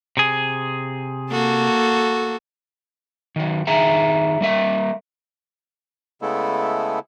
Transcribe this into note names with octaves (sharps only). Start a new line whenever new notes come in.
C3 G#4
A#3 F#4 A4
D#3 F#3
D#3 G#4 E5 A#5
G3 A#3 E5
C#3 G#3 A3 B3 E4 A4